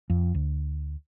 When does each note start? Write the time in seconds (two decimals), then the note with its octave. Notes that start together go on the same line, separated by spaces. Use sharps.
0.10 F2
0.35 D2